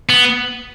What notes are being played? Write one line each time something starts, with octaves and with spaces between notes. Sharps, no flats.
B3